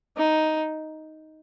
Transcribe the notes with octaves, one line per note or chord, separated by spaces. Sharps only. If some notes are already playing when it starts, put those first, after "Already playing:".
D#4